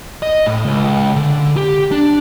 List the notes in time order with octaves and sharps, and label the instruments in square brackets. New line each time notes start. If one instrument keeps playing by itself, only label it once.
[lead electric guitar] D#5
A2
C#2
D3
G4
D4